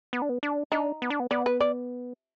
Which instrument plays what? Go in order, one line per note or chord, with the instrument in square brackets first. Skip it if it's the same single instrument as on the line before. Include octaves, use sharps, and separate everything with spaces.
[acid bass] B3
D4
B3
D4
[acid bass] D4 [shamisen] D#4
[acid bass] B3
D4
B3
[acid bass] B3 [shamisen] D5
[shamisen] B4
D5